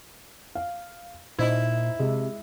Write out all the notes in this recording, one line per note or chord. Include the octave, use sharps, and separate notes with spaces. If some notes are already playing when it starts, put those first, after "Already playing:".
F5
A#2 D#4 E4 C5
C3 G#3